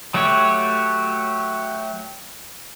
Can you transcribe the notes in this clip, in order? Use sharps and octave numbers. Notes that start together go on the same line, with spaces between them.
F#3 A3 F#4 G4 C#5